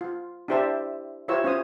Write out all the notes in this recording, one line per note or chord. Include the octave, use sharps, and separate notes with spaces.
F4
D4 E4 G4 C5 E5 A5
E4 F4 G4 C5 C#5 E6
C#4 F4 C5 D#6